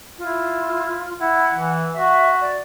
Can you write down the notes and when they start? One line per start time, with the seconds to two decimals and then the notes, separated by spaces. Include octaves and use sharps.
0.19 E4 F4
1.20 E4 F#5
1.53 E3
1.93 F#4 E5
2.41 D5